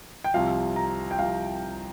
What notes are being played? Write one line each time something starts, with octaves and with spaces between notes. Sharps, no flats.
G5
C2 C3 F3 F5
A#5
G5
C2 C3 F3 F5